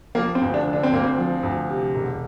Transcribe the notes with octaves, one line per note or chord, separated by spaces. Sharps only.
F3 A#3
C4
D2
D4
D3
D4
C4
D2 A#3
C4
F3
D2
C3
E1